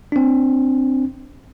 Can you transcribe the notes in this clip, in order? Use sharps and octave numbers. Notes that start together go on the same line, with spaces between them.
C4 D4